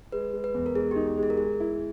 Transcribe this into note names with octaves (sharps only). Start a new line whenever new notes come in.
G#3 B4
G#3
B4
E2
A#4
G#3 G#4
D#4 G4
G4
G#3
G#4
A#4
G#3 G#4
E4